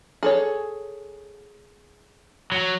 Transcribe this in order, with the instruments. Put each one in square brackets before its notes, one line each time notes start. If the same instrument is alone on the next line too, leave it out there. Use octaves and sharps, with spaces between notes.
[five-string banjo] G#4 A4 C#5
[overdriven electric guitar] F#3